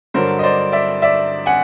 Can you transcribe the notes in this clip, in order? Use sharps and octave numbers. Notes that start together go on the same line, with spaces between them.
G2 D3 F#3 A#4 C5
D#5
C5 D5
D5 E5
D5 E5
F#5 G#5